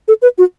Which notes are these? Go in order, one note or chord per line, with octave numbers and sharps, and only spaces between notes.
A4
B4
F#4